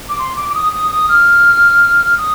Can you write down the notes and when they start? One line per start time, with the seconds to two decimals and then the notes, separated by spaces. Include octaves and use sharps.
0.09 D6
0.19 C6
0.36 D6
0.49 D6
0.55 D#6
0.73 D#6
0.91 D#6
1.09 F6
2.18 D#6